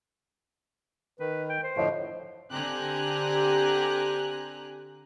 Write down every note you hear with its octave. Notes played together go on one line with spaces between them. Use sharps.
D#3 B4
G5
C5
A2 D3 F3 C#5 D#5
D3 C4 G4 G#5 A#5 F#6